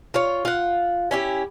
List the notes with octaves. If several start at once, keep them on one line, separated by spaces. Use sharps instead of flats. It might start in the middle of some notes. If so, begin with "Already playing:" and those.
F4 C#5
F4 F#5
C#4 E4 G4